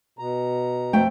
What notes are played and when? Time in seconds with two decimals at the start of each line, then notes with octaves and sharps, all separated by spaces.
0.19 B2 A#5
0.93 F2 A3 G5